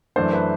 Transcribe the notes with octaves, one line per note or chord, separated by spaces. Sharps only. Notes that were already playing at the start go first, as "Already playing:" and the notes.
F#2 E3 A3 D4 C5
B4